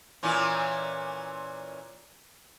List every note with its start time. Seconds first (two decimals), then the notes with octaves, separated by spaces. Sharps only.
0.23 A#2 E3 C#4